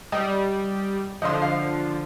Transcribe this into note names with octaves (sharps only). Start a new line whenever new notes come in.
G3 D#5
D3 F3 D#5 C6
F5